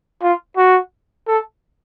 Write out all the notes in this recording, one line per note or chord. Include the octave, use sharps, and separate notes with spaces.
F4
F#4
A4